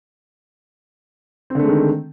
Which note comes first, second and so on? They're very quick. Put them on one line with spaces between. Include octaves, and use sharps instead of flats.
C4 D3 A3 G#3 D#3